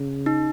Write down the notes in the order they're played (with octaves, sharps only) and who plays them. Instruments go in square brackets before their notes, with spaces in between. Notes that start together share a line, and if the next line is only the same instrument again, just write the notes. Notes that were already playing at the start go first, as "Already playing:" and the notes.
Already playing: [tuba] C#3
[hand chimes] D#4